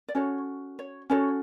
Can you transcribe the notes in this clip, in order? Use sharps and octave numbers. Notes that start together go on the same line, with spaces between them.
D5
C#4 F#4 A4 C#5
C#5
C#4 F#4 A4 C#5